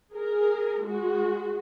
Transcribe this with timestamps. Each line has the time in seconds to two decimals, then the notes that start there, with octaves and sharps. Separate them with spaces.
0.14 G#4 A#4
0.85 G#3 F#4